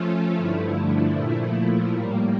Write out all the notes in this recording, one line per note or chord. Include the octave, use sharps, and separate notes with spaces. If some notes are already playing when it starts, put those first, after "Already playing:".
Already playing: F3 A3 C#4 F4 A4
G2 D3 F3 A3 E4
A#2 F3 A3 E4
A2 G3 A#3